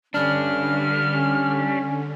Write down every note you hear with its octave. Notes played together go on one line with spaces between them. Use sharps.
D3 G3 C#4 D4 F6
C#4